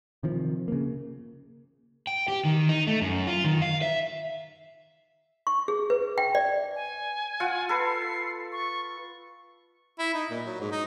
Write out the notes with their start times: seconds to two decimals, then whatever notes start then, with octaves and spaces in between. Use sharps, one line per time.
0.23 C3 D#3 F3
0.68 C#3 A#3
2.07 G5
2.28 G4
2.45 D#3
2.69 D#4
2.87 A3
3.01 F#2
3.27 F4
3.44 D#3
3.62 F5
3.82 E5
5.47 C#6
5.68 G#4
5.90 B4
6.18 G5
6.35 D5
6.75 G#5
7.40 F4 F#5
7.69 A4 B4 C7
8.52 C#6
9.99 E4
10.15 D#4
10.30 A#2
10.45 F#3
10.61 G#2
10.72 D#4